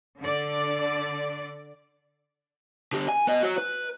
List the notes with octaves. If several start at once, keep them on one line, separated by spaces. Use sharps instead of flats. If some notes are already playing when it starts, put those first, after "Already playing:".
D3 D5
D3 G4
G#5
B3 D#5
F#4 C#5
B4